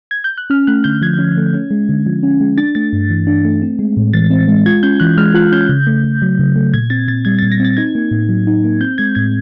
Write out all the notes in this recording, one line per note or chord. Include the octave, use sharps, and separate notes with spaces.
G#6
G6
F#6
C#4 F6
A3 F#6
D3 G6
F3 G#6
C#4
A3
C#4
G#3
D3
F3
C#4
G#3
D4 A6
A3 A6
G2
E3
D4
A3
C4
G#3
A2
E3 A6
C4
G#3
F4 G#6
C#4 G6
E3 F#6
G#3 F6
F4 F#6
C#4 G6
C#3
A3
C#3
F#3
C#3
A3
A#2 G#6
C4 A6
A#2 A6
G3 G#6
A#2 A6
A#6
C4 A6
D#4 G#6
A#3
A2
F#3
D#4
A#3
C4 G6
G#3 G#6
A2 G#6